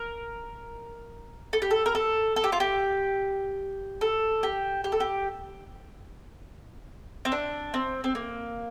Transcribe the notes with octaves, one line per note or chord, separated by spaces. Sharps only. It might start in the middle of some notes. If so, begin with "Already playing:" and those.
Already playing: A#4
A4
G4
A4
A#4
A4
A4
G4
F4
G4
A4
G4
G4
A4
G4
C4
D4
C4
C4
A#3